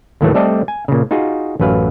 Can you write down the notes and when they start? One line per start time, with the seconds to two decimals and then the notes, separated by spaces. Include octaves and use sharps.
0.21 D#2 A2 D#3 E3 F#3 A3
0.34 G3 A3 C4 A4 D5 D#5
0.68 G#5
0.88 A#2 C#3
1.11 D#4 F4 F#4 G#4
1.60 A1 F#2 F#3 B4 F5